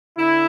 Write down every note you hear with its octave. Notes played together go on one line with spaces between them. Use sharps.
D3 E4